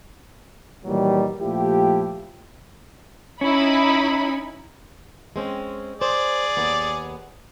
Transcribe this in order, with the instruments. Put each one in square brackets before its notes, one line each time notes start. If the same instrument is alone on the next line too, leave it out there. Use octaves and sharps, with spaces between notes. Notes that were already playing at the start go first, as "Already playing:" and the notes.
[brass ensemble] A#2 D#3 E3 F#3 G3
A#2 F3 A3 E4 G4
[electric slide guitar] C#4 [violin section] D#4 E4 B5
[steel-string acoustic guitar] G#3 C4 C#4
[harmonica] G#4 D5 [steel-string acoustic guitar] C5
[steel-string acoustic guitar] D#2 B3